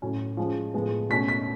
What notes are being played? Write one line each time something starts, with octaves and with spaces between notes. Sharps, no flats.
A2 F#3 C#4
F3 G#3 C#4
A2 F3 G#3 B3
B2 A3 C#4 B6
B6